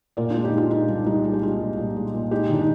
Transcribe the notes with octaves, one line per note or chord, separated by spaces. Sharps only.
A#2 A#4 D5
D4 F4
G#3
D#4 G4
G#3
D4 F4
G#3 D#4
C2 D4
C2 D#4
G#3 F4
G4
G#3 D4 F4
C2
A#2
G#3
A#2
G#3 D#4 G4
D#3 D4
D#4